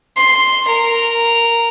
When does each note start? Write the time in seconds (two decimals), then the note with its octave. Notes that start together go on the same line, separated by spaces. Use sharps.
0.16 C6
0.67 A#4